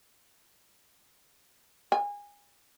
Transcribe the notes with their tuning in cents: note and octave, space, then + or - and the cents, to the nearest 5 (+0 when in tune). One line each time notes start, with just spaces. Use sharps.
G#5 -25